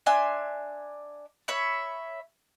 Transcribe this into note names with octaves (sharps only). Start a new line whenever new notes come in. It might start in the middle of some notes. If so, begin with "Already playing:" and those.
D4 E5 G#5 C6
C#5 E5 B5